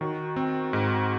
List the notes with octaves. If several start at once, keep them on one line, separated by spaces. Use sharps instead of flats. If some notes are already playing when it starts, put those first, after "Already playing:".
D#3 F#4
C4
G#2